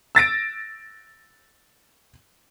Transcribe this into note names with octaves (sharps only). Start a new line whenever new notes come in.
E6 A6 A#6 D7